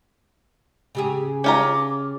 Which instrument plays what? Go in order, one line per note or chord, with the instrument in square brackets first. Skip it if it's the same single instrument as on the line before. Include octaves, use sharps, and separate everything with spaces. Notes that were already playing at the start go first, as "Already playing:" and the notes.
[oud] C#3 G4 G#4
[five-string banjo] C#4 F4 A#5 [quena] D6